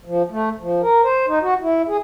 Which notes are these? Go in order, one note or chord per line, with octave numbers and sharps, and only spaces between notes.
F3
A3
F3
A#4
C5
D#4
F#4
E4
G#4